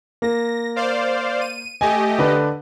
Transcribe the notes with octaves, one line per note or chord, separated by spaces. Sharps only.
A#3 A#6
C5 D5 F5
D#7
A3 G4 D#5 G#5
D3 D4 B4